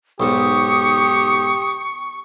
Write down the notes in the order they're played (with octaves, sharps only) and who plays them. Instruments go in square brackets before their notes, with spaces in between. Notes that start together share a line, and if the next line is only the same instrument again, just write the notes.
[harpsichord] B1 G#2 [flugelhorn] G4 [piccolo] C#6 [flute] D#6